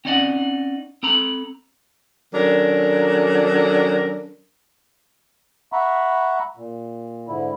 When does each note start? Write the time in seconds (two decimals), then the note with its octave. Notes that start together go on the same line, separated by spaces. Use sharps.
0.05 C4 C#4 D#4 D5 D#5 F#5
1.03 C4 A4 A#5 B5
2.34 D#3 F#3 C#4 D4 A4 A#4
5.73 E5 F#5 A#5 B5 C#6
6.57 A#2
7.28 G#2 D3 E4